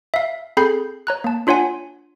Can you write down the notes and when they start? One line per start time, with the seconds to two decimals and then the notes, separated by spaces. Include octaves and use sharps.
0.14 E5 F5
0.57 C4 G#4 A4 B5 G6 C7
1.07 C#5 A#5 F#6
1.24 A#3 A5
1.47 D4 F4 C#5 F#5 G#5